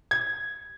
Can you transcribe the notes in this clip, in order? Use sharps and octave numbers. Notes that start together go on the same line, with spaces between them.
G#6